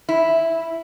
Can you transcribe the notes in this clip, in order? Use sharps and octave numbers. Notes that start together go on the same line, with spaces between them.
E4